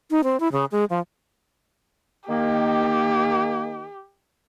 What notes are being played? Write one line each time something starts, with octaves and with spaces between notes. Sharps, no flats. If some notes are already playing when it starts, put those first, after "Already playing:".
D#4
C4
E4
C#3
G#3
F3
D#3 A#3 G4